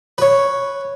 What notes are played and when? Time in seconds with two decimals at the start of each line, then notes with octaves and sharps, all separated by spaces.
0.18 B4 C#5